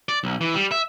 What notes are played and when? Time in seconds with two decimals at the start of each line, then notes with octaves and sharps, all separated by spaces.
0.09 D5
0.24 B1
0.41 E3
0.54 G3
0.72 E5